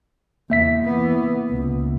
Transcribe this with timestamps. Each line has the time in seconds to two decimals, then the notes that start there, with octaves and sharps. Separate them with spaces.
0.50 E2 A#3 E5 B6
0.84 E3 B3
1.49 C#2